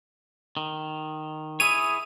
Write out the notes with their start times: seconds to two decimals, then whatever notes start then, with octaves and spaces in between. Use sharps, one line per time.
0.57 D#3
1.60 E4 G#4 C#5 D#6 D#7